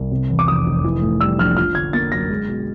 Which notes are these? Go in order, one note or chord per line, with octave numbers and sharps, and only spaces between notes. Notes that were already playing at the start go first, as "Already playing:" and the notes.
Already playing: C2
C3
E2
D6
F1 D#6
F1
E3
A2
G3 E6
A#1 F6
F3 F6
D3 G#6
A#3 A6
F#2 A#6
G#3
B2